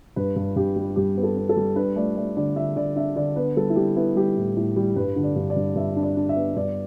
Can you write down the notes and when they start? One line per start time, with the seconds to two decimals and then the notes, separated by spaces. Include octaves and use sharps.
0.16 G2 B4
0.36 G2
0.56 G2 G4
0.76 G3
0.96 G2 G4
1.17 B3
1.23 A4
1.37 B3
1.49 A4
1.57 G3
1.76 D4 B4
1.96 A3 D5
2.17 A3 D5
2.37 D3 D5
2.56 D3 E5
2.76 D3 D5
2.96 D4 E5
3.16 D3 D5
3.36 B3 B4
3.57 G3 A4
3.70 E4
3.76 G3 G4
3.96 B3 E4
4.16 G3 G4
4.37 A2
4.57 A2
4.76 G3
4.96 G2 B4
5.16 D3
5.24 D5
5.36 G2
5.50 D5
5.56 G2
5.76 G2 E5
5.96 D4
6.03 D5
6.17 D4
6.29 E5
6.36 B3
6.56 G2 D5